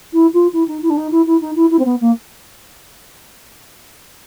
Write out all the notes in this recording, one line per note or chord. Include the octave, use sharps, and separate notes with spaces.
E4
F4
E4
D#4
E4
D4
D#4
E4
E4
D#4
E4
E4
C4
B3
A#3